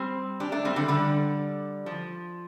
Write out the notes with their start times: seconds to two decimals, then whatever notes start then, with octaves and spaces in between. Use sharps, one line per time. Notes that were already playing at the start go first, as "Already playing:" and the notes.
Already playing: G3 C4
0.40 D4 G4
0.52 A3 D4
0.65 G3 C4
0.76 D3 G3
0.88 D3 G3
1.86 F3